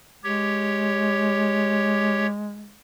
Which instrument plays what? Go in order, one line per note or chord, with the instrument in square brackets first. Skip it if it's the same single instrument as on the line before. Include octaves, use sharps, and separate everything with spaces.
[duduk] G#3 [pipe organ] G4 C#5